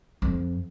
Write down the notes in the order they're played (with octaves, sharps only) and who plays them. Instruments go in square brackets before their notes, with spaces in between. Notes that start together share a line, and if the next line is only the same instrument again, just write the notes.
[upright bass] F2